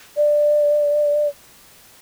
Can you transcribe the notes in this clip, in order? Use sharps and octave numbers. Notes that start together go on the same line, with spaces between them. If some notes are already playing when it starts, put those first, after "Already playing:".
D5